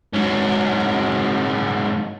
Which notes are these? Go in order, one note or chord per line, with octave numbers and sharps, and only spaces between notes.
G#2 F#3